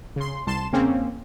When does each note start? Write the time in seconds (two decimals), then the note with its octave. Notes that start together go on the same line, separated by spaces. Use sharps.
0.16 C#3 C6
0.47 C2 A5 C6 E7
0.72 E2 C#3 A#3 C4 C#4